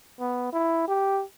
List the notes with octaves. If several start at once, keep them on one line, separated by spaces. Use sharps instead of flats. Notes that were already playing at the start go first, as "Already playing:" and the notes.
B3
E4
G4